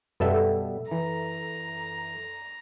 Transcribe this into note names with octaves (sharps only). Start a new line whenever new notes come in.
F#2 B2 G3 B3 A4 E5
E3 A#5